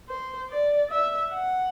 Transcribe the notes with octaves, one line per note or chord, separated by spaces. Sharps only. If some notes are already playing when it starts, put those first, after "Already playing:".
C5
D5
E5
F#5